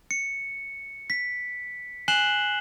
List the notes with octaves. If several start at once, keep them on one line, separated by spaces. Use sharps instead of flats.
C#7
B6
G#5 F#6 C7 E7 F#7 G7